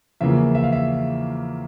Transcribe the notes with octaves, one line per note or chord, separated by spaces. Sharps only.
E2 C#3 F3 A#3 E5
E5
F5
E5